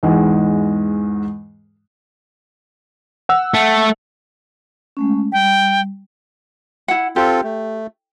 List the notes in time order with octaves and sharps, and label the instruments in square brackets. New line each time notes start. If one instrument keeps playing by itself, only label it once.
[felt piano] E2 G#2 G#3
[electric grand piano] F#5 E6
[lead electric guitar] A3
[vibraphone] G#3 A3 C#4
[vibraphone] G3 [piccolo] G5
[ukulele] E4 F#5
[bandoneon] C4 F4 A4 [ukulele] G4
[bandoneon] A3